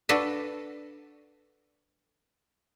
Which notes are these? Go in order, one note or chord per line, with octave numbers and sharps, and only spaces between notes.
D4 F#4 A4 B4